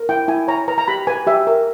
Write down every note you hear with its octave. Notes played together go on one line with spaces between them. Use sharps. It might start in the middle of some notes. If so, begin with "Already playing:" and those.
Already playing: A#4
E4 G5
E4 G#5
C#5 A#5
B4 A#5
A#5
G4 B5
B4 G#5
G4 E5
A#4